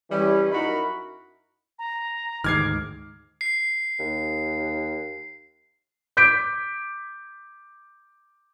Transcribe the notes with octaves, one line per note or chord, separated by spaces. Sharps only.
E3 G3 C#4
F#2 D#4 E4 F#4 A#4 B5
A#5
D2 G#2 D#3 D6 F6 G#6 C7
C7
D#2
D6 G6 B6 D7